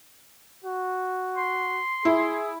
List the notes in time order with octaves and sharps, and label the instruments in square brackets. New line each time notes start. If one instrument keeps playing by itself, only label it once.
[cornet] F#4
[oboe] C6
[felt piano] E4 [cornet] G#4